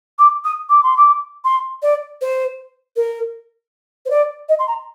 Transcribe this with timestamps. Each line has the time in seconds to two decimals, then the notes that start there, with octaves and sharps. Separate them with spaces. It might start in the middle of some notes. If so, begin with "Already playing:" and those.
0.19 D6
0.44 D#6
0.69 D6
0.83 C6
0.97 D6
1.44 C6
1.82 D5
2.21 C5
2.96 A#4
4.05 C5
4.10 D5
4.49 D#5
4.59 C6
4.67 A#5